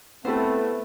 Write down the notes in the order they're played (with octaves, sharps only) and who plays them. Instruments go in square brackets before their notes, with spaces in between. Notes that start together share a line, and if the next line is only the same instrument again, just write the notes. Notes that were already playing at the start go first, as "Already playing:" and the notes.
[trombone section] A3 [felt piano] B3 E4 A4 [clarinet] C4 [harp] B4 C5